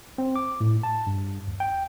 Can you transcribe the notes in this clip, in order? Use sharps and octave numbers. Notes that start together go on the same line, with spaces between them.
C4
D6
A2
A5
G2
D#2
G5